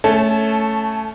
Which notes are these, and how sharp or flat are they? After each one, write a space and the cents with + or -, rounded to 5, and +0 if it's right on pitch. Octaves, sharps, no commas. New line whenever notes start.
A3 +0 C#4 +0 A5 -25